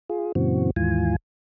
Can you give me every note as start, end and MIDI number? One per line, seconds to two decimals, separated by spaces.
0.09 0.32 65
0.09 0.32 68
0.35 0.70 42
0.35 0.70 46
0.35 0.70 49
0.35 0.70 52
0.35 0.70 60
0.35 0.70 66
0.76 1.16 39
0.76 1.16 44
0.76 1.16 52
0.76 1.16 65
0.76 1.16 80